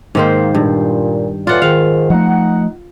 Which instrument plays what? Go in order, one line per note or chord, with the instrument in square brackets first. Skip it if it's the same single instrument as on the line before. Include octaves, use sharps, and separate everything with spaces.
[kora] G#2 D#3 C5 [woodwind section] A#3
[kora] G2 [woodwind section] A#2
[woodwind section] A2 E3 D5 [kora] F4 F#5
[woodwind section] G#2 D#3 [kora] F5
[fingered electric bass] F3 A3 [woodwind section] D#4 F#5